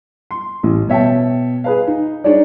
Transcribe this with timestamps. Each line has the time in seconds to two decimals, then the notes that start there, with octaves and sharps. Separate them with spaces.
0.31 C6
0.63 A1
0.88 B2 C#5 E5 G5 A5
1.64 G#4 B4 F5
1.87 D#4
2.24 D4 D#4 G#4 C#5 D5